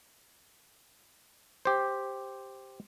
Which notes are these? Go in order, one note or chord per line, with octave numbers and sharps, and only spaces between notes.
G4 C5